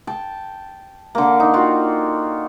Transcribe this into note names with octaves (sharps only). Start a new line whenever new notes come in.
G5 A5
D3 A#3
D#4
F4 F#4 G5